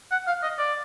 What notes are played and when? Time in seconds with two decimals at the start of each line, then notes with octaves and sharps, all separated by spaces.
0.11 F#5
0.27 F5
0.43 D#5
0.58 D5